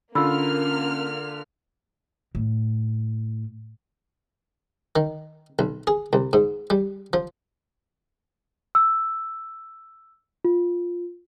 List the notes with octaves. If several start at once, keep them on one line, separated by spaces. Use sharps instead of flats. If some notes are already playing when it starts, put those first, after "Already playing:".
D3 A#3 C#4 F4 B5 E6 F6
A2
D#3
B1
G#4
C2
G#2
G3
F3
E6
F4